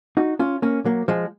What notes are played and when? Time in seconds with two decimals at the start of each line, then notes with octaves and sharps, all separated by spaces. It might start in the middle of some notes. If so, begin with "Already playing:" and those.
0.17 D#4 F#4
0.39 C#4 F4
0.62 A#3 C#4
0.85 F#3 A#3
1.08 F3 G#3